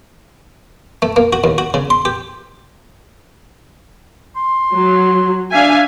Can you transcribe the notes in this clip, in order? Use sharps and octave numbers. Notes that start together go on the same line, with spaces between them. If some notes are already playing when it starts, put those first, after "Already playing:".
A3
A#3
F#4
D#2
F#4
C#3
C6
G4
C6
F#3
D4 E5 F5 G#5